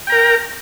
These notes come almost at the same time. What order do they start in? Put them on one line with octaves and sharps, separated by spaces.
G5 A#5 A#4